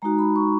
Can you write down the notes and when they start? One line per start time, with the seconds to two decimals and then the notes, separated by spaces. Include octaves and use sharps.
0.02 G#3 D#4 F#4 A#5
0.19 B5
0.36 C#6